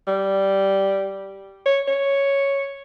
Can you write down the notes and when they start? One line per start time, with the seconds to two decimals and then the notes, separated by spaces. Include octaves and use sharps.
0.07 G3
1.66 C#5
1.88 C#5